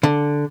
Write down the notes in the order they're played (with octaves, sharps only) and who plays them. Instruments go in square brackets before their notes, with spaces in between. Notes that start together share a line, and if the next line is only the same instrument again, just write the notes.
[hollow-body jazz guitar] D3